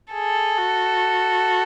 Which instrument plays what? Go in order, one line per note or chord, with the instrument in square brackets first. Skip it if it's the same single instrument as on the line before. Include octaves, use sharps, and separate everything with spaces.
[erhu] G#4 [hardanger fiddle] A4
[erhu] F#4